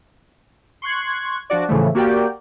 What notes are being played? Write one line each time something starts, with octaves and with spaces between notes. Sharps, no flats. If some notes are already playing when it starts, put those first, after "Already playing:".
C6 C#6 F#6 G#6
F3 D4 F#4 D5
A2 C#3 E3 F3 A3
A#3 F#4 G4 A#4 D5 G5